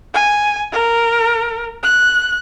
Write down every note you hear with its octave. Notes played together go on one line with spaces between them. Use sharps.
G#5
A#4
F#6